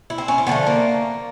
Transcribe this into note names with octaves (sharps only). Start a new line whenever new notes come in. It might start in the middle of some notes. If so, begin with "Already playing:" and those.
E4
C4
C#4
C4
D3 F3 A3 B3
A#3